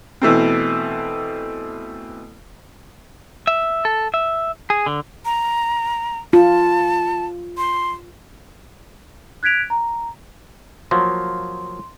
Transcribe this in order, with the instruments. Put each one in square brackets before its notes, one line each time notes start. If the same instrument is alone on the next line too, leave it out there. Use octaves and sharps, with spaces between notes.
[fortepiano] B2 E3 A3 C4
[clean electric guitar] E5
A4
E5
G#4
D3
[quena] A#5
[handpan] F4 [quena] A5
[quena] C6
[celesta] F#6 G#6 B6 D7 F7
A#5
[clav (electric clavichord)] F3 F#3 A#3 [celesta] C6